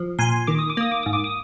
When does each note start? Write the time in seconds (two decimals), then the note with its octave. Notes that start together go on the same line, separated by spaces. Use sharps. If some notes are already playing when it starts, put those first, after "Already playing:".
Already playing: F3
0.19 A#2 G#5 C6
0.47 D#3 D6
0.59 D#6
0.70 D6
0.77 A#3 D#6
0.92 D6
1.03 G#2 D#6
1.13 D6
1.24 D#6